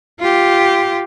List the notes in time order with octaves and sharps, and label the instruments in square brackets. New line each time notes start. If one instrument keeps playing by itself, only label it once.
[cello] F4 G4